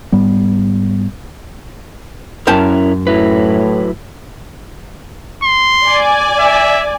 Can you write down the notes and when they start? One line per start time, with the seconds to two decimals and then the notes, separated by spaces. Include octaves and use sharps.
0.12 G#2 G3 B3
2.47 F#2 C#4 E4 A#4 G5 A5
3.07 A2 F#3 E4 B4
5.43 C6
5.85 D5 G#5
6.39 E5